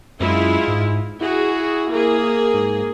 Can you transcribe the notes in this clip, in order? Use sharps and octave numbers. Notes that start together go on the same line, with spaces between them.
F#2 G#3 E4 F4
G#2
E4 F#4 G#4
A#3 G#4
G#2